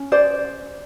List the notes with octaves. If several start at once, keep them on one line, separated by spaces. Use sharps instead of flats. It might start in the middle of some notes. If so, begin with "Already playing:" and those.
Already playing: C#4
C5 D5